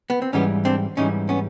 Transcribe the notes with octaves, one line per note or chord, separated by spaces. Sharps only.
B3
C4
G#2 E3 G3 B3 C#4
C4 D4
G#2 E3 G3 C#4 D#4
B3 C#4